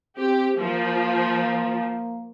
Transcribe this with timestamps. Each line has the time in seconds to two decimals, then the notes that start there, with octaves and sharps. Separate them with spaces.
0.18 C4 G4
0.59 F3 A#3